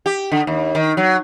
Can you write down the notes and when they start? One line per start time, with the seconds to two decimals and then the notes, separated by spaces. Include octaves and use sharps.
0.06 G4
0.32 D3
0.47 D#2
0.75 D#3
0.97 F#3